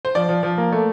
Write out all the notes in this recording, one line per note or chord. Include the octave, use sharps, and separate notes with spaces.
C5
F3 D5
F3
F3
A#3
A3